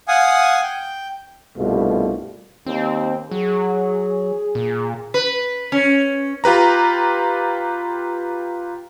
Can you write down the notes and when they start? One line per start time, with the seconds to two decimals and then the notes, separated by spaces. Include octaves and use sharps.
0.08 F5 F#5 G#5 D#6
0.62 G5
1.58 C2 G2 B2 A3 F4
2.66 D#2 C4
3.31 F#3 G#4
4.55 A#2
5.14 B4
5.72 C#4
6.44 F4 G4 B4 A#5